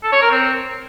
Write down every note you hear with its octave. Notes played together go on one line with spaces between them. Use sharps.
A4
C#5
A#4
C4